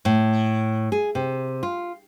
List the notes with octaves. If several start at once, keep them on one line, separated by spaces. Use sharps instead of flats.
A2
G#4
C3
F4